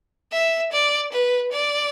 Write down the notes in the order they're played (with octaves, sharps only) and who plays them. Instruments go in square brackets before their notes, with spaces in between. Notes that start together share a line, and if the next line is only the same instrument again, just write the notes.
[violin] E5
D5
B4
D5